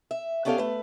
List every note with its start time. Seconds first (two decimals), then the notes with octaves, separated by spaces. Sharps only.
0.11 E5
0.45 B3 C#4 D4 G4 A4 F5
0.58 A3 B4